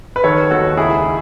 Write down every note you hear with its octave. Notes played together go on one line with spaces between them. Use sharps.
B4
D#3 A4 C#5
D#2 F#4 A4
C#2 E4 G#4